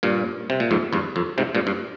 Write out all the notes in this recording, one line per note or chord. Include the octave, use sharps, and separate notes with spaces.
G2 A#2
C3
A#2
F2 G#2
E2 G2
F2
G#2 C3
G2 A#2
G2